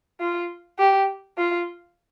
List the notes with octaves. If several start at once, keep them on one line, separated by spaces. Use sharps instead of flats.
F4
G4
F4